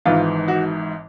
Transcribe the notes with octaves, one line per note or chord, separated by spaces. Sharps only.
G#1 G#2 E3 F4
F#4